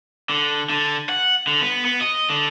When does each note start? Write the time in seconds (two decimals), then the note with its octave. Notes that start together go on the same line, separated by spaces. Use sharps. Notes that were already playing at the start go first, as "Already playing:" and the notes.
0.29 D3
0.70 D3
1.09 F#5
1.47 D3
1.61 B3
1.85 B3
2.01 D#5
2.30 D3